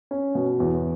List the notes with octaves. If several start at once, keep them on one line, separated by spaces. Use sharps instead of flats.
C#4
B2
E2